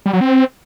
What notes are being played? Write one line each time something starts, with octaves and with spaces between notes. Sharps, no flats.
G3
F#3
C4